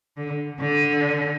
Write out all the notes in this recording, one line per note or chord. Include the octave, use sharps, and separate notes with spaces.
D3
D3